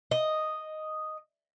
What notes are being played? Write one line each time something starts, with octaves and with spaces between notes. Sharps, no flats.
D#5